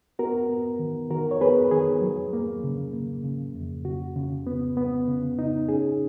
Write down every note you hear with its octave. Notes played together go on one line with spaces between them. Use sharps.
B3 F#4 A#4
B3
D#3
D#3 F#4 A#4
C#5
B3 G#4 B4
D#3 G#4
F#3
A#3
C#3
A#3
C#3
F2
C#3 F#4
C#3
B3
B3
C#3
D#4
C#4 G#4